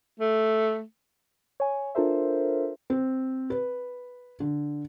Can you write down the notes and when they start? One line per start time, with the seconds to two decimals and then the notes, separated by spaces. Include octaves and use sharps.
0.20 A3
1.60 C#5 G#5
1.95 D4 F4 A4 A#4 C5 E5
2.90 C4
3.50 B4
4.40 D3